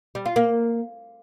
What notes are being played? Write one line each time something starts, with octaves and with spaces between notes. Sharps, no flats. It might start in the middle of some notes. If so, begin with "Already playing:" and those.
G3
F4
A#3